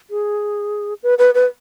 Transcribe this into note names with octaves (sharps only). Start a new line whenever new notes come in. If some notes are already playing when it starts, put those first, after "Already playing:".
G#4
B4
B4
B4